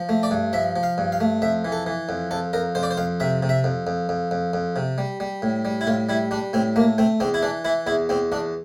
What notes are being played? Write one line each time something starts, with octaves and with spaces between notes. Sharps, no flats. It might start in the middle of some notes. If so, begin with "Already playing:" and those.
Already playing: F3
A3
D5
G2
F3 E5
F3
F5
G2
F5
A3
F2 E5
E3
A4
E3
F2
F2 A4
F2 A#4
F2 C5
D5
C5
F2 F5
C3 E5
C3
E5
F2
F2
F2
F2
F2
C3
G3
G3
A2
G3
E4
A2 F4
G3 E4
G3 D4
A2 C4
A3 A#3
A3 C4
E2 C4
E4
E3 D4
E3 E4
E2 E4
E2 C4
E2 D4